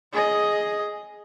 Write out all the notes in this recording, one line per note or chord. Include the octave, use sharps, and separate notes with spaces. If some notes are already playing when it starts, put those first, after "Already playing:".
G#4 D#5